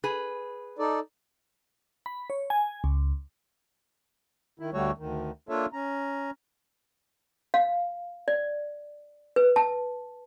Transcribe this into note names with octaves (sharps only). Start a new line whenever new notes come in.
G#4 B4
D#4 A4 D5
B5
C#5
G#5
C#2
D#3 E4
D2 D3 G3 A3 F#4 C#5
D2 D#3
A#3 D4 F4 A4 C#5 E5
C#4 A#5
F5
D5
B4
A5